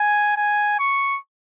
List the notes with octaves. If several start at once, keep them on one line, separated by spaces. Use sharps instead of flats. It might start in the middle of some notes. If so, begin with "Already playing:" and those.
Already playing: G#5
G#5
C#6